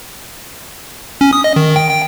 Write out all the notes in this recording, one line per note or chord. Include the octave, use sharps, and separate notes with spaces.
C#4
D#6
D#5
D#3
G5
G5